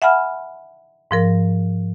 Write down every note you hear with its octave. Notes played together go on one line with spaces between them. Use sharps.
E5 F#5 G#5 B5 F6
G#2 F3 A#4